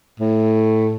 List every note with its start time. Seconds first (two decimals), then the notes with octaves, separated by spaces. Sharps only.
0.20 A2